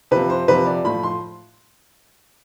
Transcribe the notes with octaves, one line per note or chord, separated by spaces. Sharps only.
C3 F3 B4
C5
C3 F3 B4
D5
A2 F3 B5
C6